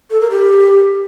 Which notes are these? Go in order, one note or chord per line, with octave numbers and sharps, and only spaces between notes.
A4
A#4
G4